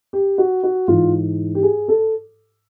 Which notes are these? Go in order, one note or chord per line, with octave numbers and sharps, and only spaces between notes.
G4
F#4
F#4
G#2 E3 F4
G4
G#4
A4